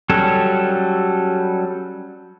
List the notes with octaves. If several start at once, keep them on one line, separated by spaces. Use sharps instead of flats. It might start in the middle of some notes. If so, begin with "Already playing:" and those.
F#3 G3 C#4 A4